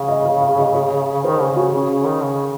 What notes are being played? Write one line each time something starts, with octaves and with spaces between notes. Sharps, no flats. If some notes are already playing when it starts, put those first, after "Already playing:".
Already playing: C#3 F5
D#5
F5
F5
D#5
C#5
D#3 C5
C#3 G#4
C#3 F#4
C#3 C#4
C#3
D#3
C#3